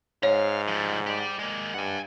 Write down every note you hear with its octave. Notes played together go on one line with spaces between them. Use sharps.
G#2 C#5 F5
F3 G3
G4 D5
G#3 A#3
G2 F#5 G#5